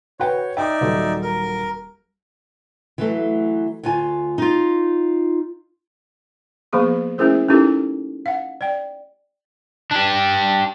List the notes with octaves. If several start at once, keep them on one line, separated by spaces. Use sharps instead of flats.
F#4 B4 C#5 G5
D#4 D5 E5 G5 D6
D#1 F#3 A4
A#4
E3 F#3 A3
D2 F4 G#5
D#4 F4
F3 A#3 B3 G#4 C#6
A3 C#4 E4 G#4 A#4 C5
C#4 D#4 E4 G4 A4 A#4
F5 F#5
D5 G5
D4 G4